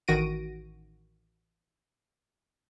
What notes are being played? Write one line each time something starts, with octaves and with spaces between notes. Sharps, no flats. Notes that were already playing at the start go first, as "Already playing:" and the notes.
A1 D#3 F#4 A#6 D7 D#7